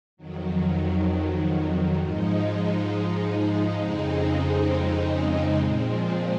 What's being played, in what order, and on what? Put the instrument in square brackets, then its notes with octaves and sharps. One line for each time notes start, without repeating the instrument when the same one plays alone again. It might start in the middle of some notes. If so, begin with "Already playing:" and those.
[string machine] F2 D#3 F#3
G#2 F3 G#3 D#4
F2 C#3 G#3 C4 D#4
A#2 F3 G#3 C4